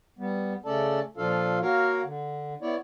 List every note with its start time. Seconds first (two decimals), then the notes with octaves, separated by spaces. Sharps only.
0.18 G3 B3
0.65 C#3 A3 C#4 A4 D5 A5
1.17 A#2 F3 D4 F4 A4 F5
1.62 A#3 F#4 A#4 C#5 F5
2.04 D3
2.62 B3 E4 C#5 D5